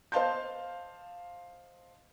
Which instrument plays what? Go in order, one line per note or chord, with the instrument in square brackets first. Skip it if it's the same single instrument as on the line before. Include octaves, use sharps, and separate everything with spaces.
[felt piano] C5 D#5 F5 A5 C6 G6